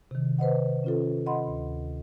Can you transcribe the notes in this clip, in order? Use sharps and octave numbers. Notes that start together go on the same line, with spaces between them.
C3 D#3
B4 C5 D#5 F#5
C#4 F4 A4
D#5 F#5 B5 C6
D2